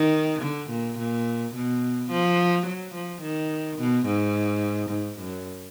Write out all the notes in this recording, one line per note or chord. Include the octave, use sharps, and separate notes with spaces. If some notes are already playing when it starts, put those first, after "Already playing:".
Already playing: D#3
D3
A#2
A#2
B2
F3
F#3
F3
D#3
B2
G#2
G#2
F#2